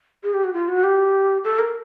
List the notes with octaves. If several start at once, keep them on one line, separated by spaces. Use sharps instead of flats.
G#4
G4
F#4
F4
F#4
G4
A4
A#4